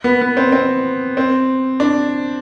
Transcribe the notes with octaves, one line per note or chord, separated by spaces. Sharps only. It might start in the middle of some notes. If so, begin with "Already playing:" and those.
B3
B3
C4
C4
C4
D4